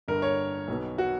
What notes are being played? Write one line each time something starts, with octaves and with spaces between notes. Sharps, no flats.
G1 G2 D3 A#4
C#5
B1 B2
F#4